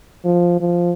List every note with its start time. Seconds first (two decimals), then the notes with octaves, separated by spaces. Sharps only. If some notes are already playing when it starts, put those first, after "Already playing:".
0.25 F3
0.60 F3